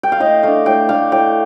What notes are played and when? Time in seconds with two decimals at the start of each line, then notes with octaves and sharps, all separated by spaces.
0.03 G5
0.12 F5
0.20 A2 D#5
0.43 A3 D4 F5
0.66 A2 G5
0.89 A3 D4 F5
1.12 A2 G5